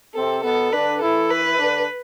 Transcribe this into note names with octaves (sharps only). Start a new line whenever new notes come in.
C3 C4 A4
B2 B3 A4
D3 D4 B4
E3 E4 A4
B4
D3 D4